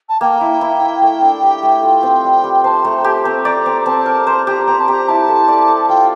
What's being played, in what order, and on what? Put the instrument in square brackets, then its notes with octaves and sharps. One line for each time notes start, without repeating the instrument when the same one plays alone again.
[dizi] A5
[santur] A#3 [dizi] G5
[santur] E4
E4
E4
A3
D4
G4
A3
F4
C4
G3
G3
[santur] C5 [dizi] A5
[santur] A3 [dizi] A#5
[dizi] G5
[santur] G4 [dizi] A5
[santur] C4 [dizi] A#5
[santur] D5 [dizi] A#5
[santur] C4
[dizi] A#5
[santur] C4 [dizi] A5
[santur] A#4
[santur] C5 [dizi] A#5
[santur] G4 [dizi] A#5
[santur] C4 [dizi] A#5
[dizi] A5
[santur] G4 [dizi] A#5
[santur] E4 [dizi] A5
[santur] A4
D5
A4
[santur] F4 [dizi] G5